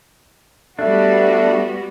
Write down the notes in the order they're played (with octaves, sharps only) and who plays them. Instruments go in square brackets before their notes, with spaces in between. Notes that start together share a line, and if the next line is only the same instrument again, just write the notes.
[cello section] G3 B3 F#4 [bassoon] A3 [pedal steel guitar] D4